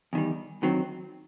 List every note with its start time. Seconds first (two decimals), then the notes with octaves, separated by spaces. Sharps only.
0.13 E2 D#3 G3
0.63 D#3 F#3 C4